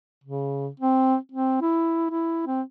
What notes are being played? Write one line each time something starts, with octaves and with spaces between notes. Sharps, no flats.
C#3
C4
C4
E4
E4
C4